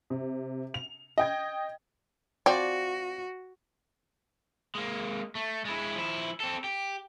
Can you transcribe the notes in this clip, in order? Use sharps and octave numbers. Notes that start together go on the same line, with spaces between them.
C3
F7
D#5 G5 G#6
F3 C4 F#4 D5 G5
G#3 A#3
A3
G#3 E4
F3 E4
C4 A4
G4